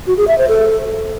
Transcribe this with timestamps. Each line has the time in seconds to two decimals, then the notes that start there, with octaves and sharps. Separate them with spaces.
0.07 F#4
0.17 G#4
0.28 E5
0.38 C5
0.49 A4